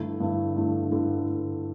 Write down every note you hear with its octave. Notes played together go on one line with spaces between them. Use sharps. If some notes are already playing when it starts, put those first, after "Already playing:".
Already playing: G2 D3 A3 E4
G2 D3 A3 E4
G2 D3 A3 E4
G2 D3 A3 E4